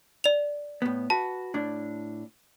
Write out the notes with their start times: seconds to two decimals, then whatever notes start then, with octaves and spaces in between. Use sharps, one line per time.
0.24 D5 F7
0.82 A2 B3
1.10 F#4 B4 A5
1.54 A2 D4